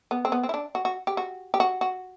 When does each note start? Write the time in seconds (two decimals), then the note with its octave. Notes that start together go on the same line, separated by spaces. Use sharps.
0.11 B3
0.25 C4
0.32 B3
0.43 C4
0.49 E4
0.54 D4
0.75 F#4
0.85 F#4
1.07 G4
1.17 F#4
1.54 G4
1.60 F#4
1.81 F#4